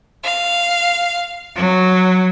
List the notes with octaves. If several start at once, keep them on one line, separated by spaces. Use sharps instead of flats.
F5
F#3